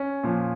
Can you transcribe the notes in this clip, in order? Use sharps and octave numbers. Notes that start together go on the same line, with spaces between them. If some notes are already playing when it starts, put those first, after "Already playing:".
Already playing: C#4
A#2 F3